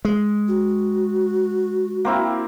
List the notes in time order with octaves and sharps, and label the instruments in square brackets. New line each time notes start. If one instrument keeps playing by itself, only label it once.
[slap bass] G#3
[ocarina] F#4
[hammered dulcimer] A#3 C4 E4